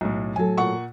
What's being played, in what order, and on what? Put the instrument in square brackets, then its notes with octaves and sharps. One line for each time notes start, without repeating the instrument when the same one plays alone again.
[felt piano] B1 A2
[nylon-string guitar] A2 F#3 A4 [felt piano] G#5
[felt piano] A#2 F#5 C#6